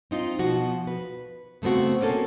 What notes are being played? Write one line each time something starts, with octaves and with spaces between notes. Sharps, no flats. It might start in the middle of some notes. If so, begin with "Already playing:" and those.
C4 D#4 F4
B2 F3 F#4
B4
C#3 A3 B3 C4 F#4
A#3 C4 C#4 A4